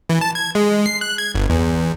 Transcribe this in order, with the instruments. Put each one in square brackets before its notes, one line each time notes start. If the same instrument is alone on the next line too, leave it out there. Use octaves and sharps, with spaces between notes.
[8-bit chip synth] E3
A5
G#6
G#3
C7
F#6
G#6
G1
E2